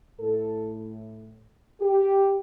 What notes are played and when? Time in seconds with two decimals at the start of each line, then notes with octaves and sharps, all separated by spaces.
0.19 A2 A4
1.81 G4